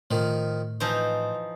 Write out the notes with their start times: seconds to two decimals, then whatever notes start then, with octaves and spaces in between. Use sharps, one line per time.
0.11 A2 D#3 F3
0.81 E3 F3 D#4 C5